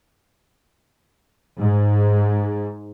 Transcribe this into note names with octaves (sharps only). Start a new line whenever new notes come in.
G#2